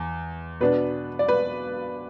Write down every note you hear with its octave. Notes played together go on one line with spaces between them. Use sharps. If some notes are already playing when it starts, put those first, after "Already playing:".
Already playing: E2
B2 B3 D4 B4
D5
B4